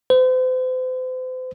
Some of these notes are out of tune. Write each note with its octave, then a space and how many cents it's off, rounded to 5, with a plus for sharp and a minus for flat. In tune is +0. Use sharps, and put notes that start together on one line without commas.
C5 -40